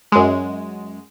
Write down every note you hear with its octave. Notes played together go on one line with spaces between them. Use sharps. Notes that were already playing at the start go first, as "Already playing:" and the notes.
F#2 G#3